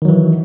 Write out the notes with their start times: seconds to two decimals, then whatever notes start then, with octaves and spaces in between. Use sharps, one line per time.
0.02 D#3
0.05 F#3
0.08 E3